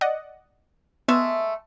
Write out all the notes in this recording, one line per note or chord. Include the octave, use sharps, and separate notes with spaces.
D5 D#5 F#5
G#3 A3 B3 E5